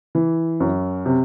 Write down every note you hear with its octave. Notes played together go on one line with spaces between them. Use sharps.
E3
F#2
C3